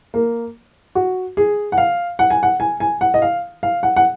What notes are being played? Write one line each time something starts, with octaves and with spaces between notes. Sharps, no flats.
A#3
F#4
G#4
F#5
F5
F#5
G#5
F#5
G#5
G#5
F#5
D#5
F5
F5
F#5
F#5